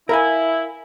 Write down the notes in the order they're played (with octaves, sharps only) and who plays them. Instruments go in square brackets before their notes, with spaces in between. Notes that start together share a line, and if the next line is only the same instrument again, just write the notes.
[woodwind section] E4 [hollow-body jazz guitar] A#4 F5 G#5